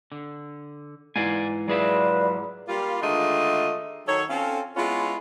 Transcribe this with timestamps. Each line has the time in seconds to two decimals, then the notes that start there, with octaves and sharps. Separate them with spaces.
0.12 D3
1.16 G#2 E3 D5 F5 G#5
1.68 F#3 F4 G#4 B4 D5 E5
2.68 G3 A#3 F4
3.01 D3 D#3 G#3 A3 F4 D#5
4.07 D#3 F#3 A4 C#5
4.29 C4 C#4 F4 A4
4.76 G#3 B3 C#4 E4 F4